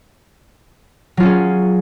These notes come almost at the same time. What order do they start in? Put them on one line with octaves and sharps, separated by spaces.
F#3 F4 C#4 G#4